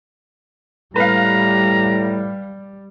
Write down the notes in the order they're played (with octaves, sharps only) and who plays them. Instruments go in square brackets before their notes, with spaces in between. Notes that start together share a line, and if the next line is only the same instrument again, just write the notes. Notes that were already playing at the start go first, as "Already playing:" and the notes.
[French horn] A2 [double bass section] G3 [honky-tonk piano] B4 F5 [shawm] A#5